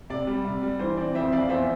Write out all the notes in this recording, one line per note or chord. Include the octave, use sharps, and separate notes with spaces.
C3 D5
G3
C3
G3
E3 C5
C4 D5
F2 C5 E5
F2 D5 F5
E2 C5 E5